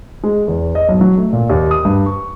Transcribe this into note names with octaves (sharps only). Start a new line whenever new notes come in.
G#3
E2
D#5
B1
F#3
A3
A#2
D#2
D#6
G2
C#6